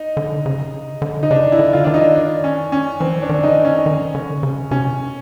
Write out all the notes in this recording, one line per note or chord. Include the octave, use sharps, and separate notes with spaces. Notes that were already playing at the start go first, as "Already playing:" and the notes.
Already playing: D#4
D3
C#3
D3
D#4
C#3 D4
E4
D3
F4
D#3 D4
D#4
D4
C#4
C#4
E3 C4
D4
D#3
C#3 D#4
D3
D#3
C#4
D#3
D3
C#3
C3 C#4